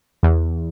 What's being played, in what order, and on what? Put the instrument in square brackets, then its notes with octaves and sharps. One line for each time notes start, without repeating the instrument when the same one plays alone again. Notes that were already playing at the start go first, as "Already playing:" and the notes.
[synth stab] E2